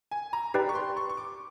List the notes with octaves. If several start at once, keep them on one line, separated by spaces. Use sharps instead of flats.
G#5
A#5
D#4 G4 B4 D5 G5 B5
C#6
C6
C#6
C#6
D6